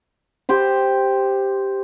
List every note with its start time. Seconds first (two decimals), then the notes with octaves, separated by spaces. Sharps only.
0.49 G4 C5 C6